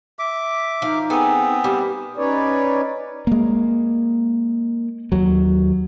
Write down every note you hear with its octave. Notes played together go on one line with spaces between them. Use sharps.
E5 D6
F3 D#4 F5
B3 C4 G#4 A4 G#5
G3 A#3 G4
C#4 D#4 B4 C#5 D5
G#3 A#3
D#2 F#3